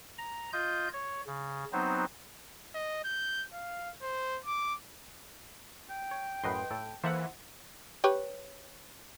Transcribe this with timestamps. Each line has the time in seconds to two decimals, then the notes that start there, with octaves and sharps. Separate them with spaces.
0.18 A#5
0.53 F4 D#5 G6
0.93 C#5
1.27 C#3
1.73 F#3 B3 C4 D#4 C5
2.75 D#5
3.04 G6
3.54 F5
4.03 C5
4.45 D6
5.90 G5
6.11 C#5
6.44 F#2 A2 B4 D#5 C6
6.71 A2 A4
7.04 E3 A#3 A4 C5 E5 F#5
8.04 G4 B4 C#5